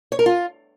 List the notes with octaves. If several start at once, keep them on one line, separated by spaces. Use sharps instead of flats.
C#5
A#4
F4